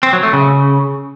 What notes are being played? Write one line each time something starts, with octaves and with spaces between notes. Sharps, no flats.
C4
F#3
A3
C#3